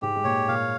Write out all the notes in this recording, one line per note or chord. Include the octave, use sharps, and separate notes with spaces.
G#2 G#3 G4
G#3
A#2 A#3 C#5
A#2 A#3 F5